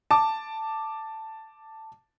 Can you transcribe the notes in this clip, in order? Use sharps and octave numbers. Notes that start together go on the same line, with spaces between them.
A5 D6